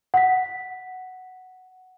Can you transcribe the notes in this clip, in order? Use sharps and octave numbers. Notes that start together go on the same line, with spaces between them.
F#5 B6